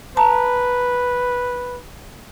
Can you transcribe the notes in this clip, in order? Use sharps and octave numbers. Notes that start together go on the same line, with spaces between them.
B4 A5 A#5